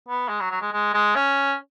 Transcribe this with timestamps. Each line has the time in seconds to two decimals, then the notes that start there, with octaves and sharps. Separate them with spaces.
0.08 B3
0.29 G#3
0.40 F#3
0.51 F#3
0.61 G#3
0.72 G#3
0.94 G#3
1.15 C#4